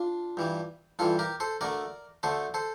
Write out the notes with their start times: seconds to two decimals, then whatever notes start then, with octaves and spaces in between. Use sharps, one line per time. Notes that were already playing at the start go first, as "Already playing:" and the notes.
Already playing: D4 F4
0.37 G2 E3 G3
0.99 G2 E3 G3 F4 A4
1.19 G4 A#4
1.40 A4 C5
1.61 D2 D3 A3 A#4 D5
2.23 D2 D3 A3 A4 C5
2.54 A4 C5